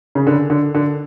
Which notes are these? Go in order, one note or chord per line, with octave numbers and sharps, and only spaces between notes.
C#3
D3
D3
D3